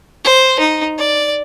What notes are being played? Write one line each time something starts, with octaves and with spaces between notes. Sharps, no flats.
C5
D#4
D5